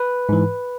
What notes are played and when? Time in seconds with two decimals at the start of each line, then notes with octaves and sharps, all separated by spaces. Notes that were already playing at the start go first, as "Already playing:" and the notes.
Already playing: B4
0.29 G#2 E3